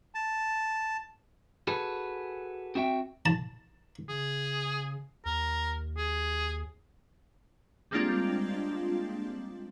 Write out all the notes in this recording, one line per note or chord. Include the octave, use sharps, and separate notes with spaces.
A5
F#4 G#4 A4 B4
C4 F#4 E5 G5
A5
C#3 G#4
D#2 A#4
G#4
G3 G#3 A#3 C4 D4 F4